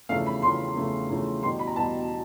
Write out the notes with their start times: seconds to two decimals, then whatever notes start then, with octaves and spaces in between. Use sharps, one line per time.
0.09 E2 C#3 F3 A3 F5
0.26 B5
0.42 E2 C#3 F3 A3 C6
0.76 E2 C#3 F3 A3
1.09 E2 C#3 F3 A3
1.42 E2 B2 G3 C6
1.59 B5
1.67 A#5
1.75 E2 B2 G3 A5